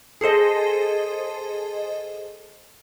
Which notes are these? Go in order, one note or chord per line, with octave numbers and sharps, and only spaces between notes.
G#4 A4 C5 D#5